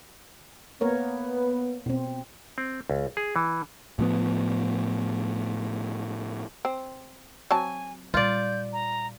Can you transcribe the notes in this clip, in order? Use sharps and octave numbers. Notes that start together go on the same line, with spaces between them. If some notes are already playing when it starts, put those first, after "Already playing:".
A#3 B3 A#4 C#5
B2 C4
C4
C#2
G#4
E3
A2 F3 B3
C4
F#3 C4 G#5 A5
A#2 G3 F4 D5 G6
A#5